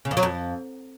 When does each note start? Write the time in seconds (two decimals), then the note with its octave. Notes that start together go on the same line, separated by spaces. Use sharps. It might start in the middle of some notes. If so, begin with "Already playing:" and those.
0.05 C#3
0.11 F2
0.17 F#3
0.23 F2